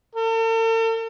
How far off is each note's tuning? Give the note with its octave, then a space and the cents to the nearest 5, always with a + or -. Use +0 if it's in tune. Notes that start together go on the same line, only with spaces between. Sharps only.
A4 +45